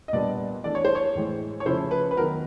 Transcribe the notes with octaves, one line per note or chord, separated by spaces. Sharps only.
D#5
A#2 G3 B3 D4 D5
E3 A3 D4 D5
C#5
C5
C#5
A2 E3 G#3
C#5
C#3 F3 A3 C#4 E4 C5
B4
B4
D#3 F#3 B3 A#4